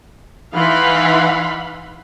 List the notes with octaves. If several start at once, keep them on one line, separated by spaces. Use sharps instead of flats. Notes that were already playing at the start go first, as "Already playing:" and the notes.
E3 D#4 F5 F#5 B5 C6